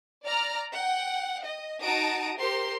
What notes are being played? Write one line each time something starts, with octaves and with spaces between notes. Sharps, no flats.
D5 A#5 F6
F#5 G5
D#5
D#4 F#4 A5 A#5 D#6 D7
G4 A#4 C5 C6